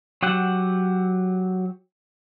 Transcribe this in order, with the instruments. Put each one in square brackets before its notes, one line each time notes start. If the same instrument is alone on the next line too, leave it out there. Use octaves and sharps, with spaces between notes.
[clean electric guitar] F#3 G4 F#5